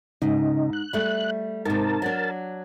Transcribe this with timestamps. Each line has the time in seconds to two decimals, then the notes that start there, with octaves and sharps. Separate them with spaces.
0.22 G#2 C#3 D#4
0.73 F#6
0.93 G3 A3
1.65 G#2 C3 A#4 A5
2.02 F#3 D4